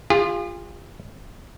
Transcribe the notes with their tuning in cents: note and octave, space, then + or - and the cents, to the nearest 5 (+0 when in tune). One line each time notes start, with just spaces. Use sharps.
F4 +0 G#4 -45